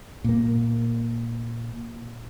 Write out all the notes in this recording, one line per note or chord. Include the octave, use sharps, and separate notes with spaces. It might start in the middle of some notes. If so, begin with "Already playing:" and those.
A#2 A#3